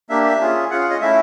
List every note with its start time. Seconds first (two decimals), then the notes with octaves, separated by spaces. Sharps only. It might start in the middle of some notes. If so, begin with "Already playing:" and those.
0.10 A#3 D4 G4 E5
0.40 C#4 F4 G#4
0.71 C#4 F4 G#4 F#5
0.80 F5
0.90 D#5
1.01 A3 C#4 E4 E5